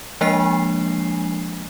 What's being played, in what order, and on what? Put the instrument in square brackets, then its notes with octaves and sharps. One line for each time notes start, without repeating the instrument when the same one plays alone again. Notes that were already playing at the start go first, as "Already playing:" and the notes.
[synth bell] F3 G#3 A#3 D4 G#5 C7